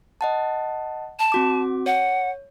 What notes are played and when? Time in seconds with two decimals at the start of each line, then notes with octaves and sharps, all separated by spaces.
0.21 D#5 F#5 A5
1.19 A5
1.32 C4 F#4 D6
1.86 C#5 F#5